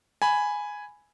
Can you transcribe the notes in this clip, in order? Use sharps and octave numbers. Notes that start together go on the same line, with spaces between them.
G#5 B5